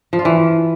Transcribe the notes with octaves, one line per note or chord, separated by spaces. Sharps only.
F3
F4
E3